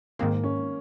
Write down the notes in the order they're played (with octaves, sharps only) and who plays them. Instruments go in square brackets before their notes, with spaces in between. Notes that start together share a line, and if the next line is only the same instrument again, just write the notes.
[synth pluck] G#2 D#3 G#3 C4 [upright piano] A#3
[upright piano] C#4